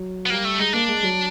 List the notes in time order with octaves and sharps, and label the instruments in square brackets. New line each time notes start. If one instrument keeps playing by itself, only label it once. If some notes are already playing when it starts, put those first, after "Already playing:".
Already playing: [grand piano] F#3
[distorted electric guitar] B3
[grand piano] G3 [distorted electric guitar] A#3
[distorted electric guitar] A3
[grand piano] G#3 [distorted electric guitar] D#4
[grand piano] A#3 [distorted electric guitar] D4
[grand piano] G#3
F#3